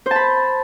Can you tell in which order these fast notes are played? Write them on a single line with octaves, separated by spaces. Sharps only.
C5 A5 B5